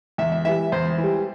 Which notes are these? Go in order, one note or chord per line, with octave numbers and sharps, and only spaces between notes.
E2 E5
E5
E3 G3 E5
E2 C5
E3
G3